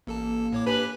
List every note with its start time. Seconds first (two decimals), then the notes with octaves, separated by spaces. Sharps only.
0.07 A1 A#3 A4 A5
0.52 A2 C#5 D6
0.66 D4 G4 B4 G#5